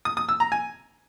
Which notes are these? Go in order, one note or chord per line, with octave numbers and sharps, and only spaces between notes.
D#6
D#6
E6
A#5
G#5